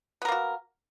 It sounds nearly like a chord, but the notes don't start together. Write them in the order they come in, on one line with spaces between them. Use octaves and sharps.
B3 A#4 A#3 F#4